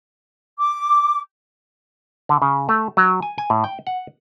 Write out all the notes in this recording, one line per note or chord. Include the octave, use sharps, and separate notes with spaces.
D6
D3
C#3
A3
F#3
G#5
G#5
A2
G5
F#5